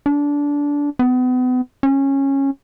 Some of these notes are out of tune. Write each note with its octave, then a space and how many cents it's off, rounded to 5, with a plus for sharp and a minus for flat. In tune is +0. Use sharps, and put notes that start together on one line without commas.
D4 -20
B3 +35
C#4 -15